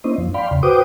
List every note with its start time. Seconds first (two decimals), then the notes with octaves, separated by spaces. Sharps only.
0.04 A#3 C#4 D4 E4 C5 D#5
0.18 F#2 F3
0.34 D5 F5 G5 B5 C6
0.51 E2 C#3
0.63 F#4 B4 C5 G5 D6 D#6